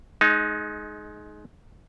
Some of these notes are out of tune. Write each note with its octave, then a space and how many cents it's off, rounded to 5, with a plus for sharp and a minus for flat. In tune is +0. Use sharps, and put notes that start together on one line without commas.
G#3 +25 D#4 +0